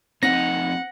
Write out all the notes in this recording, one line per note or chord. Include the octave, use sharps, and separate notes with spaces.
F2 C4 D#4 F#5 A#6